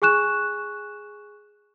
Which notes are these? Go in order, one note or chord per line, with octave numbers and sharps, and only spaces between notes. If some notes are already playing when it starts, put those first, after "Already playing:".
G#4 G#5 C#6 F#6 E7